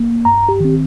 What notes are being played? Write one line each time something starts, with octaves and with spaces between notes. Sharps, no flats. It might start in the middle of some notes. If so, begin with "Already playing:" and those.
Already playing: A#3
G2 A#5
G4
D#3 C4